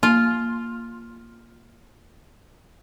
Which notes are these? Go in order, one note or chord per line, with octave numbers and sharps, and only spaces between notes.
A#3 F4